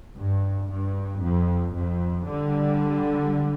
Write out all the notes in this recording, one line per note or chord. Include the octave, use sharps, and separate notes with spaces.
G2
G2
F2
F2
D3 G3